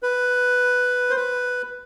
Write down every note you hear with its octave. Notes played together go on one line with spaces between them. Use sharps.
B4
C5
B4